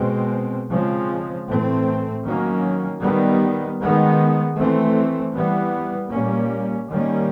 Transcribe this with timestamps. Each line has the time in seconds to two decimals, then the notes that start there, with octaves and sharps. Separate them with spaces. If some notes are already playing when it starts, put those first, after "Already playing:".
Already playing: B2 G#3 C4
0.68 C#3 F3 G#3 C4
1.47 A2 E3 A3 C4
2.23 D#3 F#3 A#3 C#4
3.01 D#3 G3 B3
3.78 D#3 G#3 B3
4.56 E3 A3 C4
5.33 E3 G3 B3
6.10 A#2 G3 A#3 C#4
6.87 D#3 G3 A#3 C#4